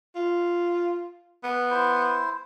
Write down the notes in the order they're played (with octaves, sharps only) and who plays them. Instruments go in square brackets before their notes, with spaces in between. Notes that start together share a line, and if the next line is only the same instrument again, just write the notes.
[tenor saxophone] F4
B3
[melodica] E4 C5